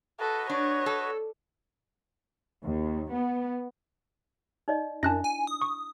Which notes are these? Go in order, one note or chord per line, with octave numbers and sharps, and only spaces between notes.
F#4 A4 B4 D#5
D4 C#5
A4
D#2
B3
D#4 D5 D#5
F#2 D4 E4 A5 F#6 A#6
G#5
D#6
C#6